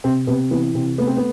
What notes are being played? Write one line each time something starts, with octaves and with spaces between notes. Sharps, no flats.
C3 C4
C3 B3
E3 B3
C3 C4
A3 B3
C4
B3